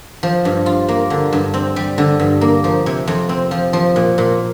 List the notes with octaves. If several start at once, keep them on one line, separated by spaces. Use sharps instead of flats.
F3
G2
F4
A#3
D3
G2
C4
G3
D3
G2
A#3
F3
C3
F2
C4
F3
F3
A#2
A#2